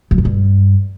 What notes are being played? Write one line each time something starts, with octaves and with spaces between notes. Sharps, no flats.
F#2
C#3
G2